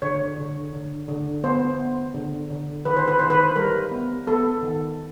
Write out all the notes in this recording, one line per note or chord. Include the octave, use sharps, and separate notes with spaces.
D3 C#5
D3
D3
D3
B3 C5
B3
D3
D3
D#3 B4
C5
B4
D#3 C5
B4
G3 A#4
B3
B3 A4
D#3